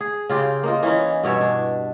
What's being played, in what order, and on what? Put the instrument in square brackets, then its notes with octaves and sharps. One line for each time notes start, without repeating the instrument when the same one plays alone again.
[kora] G#4
C#3 F4 G4
A#3 D#4 F4
E3 C#4 D#4
G2 B2 C#5 E5
D4